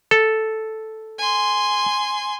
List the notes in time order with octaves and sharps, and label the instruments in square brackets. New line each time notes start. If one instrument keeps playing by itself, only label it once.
[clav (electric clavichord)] A4
[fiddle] G#5 C6